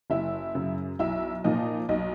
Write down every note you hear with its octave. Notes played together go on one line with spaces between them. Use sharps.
F#1 E4 E5
F#2 C#3
B1 E4 E5
A#2 F3 A#3 D#4 D#5
B1 D#4 D#5